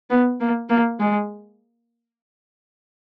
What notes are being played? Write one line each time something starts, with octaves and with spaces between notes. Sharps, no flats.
B3
A#3
A#3
G#3